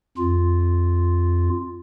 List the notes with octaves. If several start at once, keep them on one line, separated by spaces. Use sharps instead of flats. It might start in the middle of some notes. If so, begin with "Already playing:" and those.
F2 F4